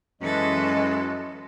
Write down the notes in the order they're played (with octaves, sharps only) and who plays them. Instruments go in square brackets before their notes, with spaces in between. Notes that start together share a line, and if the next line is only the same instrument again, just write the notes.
[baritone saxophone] F#2 [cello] E3 A4 [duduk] G#3 [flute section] F#4 B4 D#5